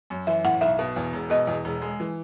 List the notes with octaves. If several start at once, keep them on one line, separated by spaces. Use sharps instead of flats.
F#2
E3 E5
A2 F#5
B1 E5
B2
E2
E1
B2 D#5
E2
E1
G#3
E3